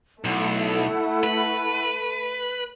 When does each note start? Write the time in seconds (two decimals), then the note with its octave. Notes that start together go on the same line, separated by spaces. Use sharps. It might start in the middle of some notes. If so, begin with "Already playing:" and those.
0.25 B1 A3 E4 F#5
1.23 B4